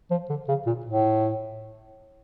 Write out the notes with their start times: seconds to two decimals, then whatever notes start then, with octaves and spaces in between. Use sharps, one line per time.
0.11 F3
0.29 D3
0.48 C#3
0.66 A#2
0.85 A2